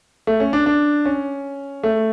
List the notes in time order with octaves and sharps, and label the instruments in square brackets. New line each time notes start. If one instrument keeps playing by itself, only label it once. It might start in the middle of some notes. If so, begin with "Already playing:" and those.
[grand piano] A3
C#4
D4
D4
C#4
A3